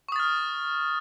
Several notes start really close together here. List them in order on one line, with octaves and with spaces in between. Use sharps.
C#6 D#6 A6 F6